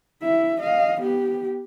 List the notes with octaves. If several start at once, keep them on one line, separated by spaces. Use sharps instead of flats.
E4 E5
D#5 F5
B3 G4